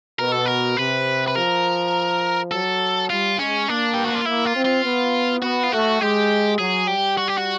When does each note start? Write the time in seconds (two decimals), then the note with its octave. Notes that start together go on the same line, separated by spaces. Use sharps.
0.19 B2 A#4
0.32 A4
0.46 A#4
0.77 C3 B4
1.27 B4
1.35 F3 A#4
2.52 F#3 A4
3.10 G3 F4
3.39 G#3 C#4
3.68 A#3 D4
3.94 G4
4.05 F#4
4.15 F4
4.26 A#3 E4
4.45 F4
4.56 C4
4.64 F4
4.84 B3
5.42 B3 F#4
5.63 F4
5.72 A3 F#4
6.01 G#3 G4
6.58 F#3 G#4
6.87 G3 G4
7.17 F#4
7.28 G4
7.37 F#4